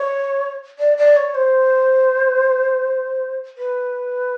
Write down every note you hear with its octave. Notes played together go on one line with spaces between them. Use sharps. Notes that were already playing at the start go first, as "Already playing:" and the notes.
Already playing: C#5
D5
D5
C#5
C5
B4